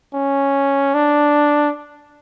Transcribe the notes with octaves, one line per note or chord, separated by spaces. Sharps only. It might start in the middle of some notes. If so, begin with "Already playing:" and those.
C#4
D4